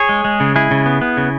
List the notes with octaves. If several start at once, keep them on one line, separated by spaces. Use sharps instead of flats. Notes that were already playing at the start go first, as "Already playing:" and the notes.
Already playing: G#4 C#5
G#3
G#3
C#3
G#3 E4 G#4
C#3
B3
B3
C#3